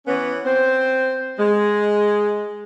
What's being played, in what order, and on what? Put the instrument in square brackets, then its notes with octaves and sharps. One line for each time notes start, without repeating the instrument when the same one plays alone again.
[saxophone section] E3 B3 C#4
C4 C5
G#3